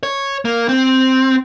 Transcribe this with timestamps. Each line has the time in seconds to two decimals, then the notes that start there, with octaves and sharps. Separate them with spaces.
0.03 C#5
0.45 A#3
0.69 C4